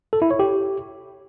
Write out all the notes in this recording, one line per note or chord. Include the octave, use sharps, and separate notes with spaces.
A4
E4
C#5
G4